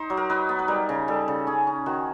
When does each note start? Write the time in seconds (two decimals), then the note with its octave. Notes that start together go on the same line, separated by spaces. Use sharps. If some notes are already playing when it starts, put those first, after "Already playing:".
Already playing: D#4 C5
0.10 F#3
0.17 A#4
0.30 D#4 B4
0.49 B3
0.59 B4
0.68 G3 A#4
0.89 C#3
1.08 G3 A4
1.28 C#3
1.47 C#4 G#4
1.67 C#4
1.86 D#3 F#4